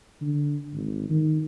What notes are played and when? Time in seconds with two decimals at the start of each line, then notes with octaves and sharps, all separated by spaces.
0.21 D3
0.73 G#1
1.10 D#3